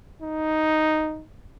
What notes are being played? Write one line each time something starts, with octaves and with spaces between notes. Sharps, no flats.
D#4